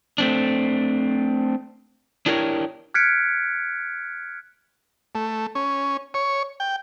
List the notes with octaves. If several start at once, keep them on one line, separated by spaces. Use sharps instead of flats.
A3 C4 D4
D4 E4 G4 A#4 C5 C#5
F6 F#6 G#6 B6 C#7 D7
A3
C#4
C#5
G5